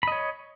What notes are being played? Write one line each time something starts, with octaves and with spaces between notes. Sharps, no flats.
C#5 D#5 B5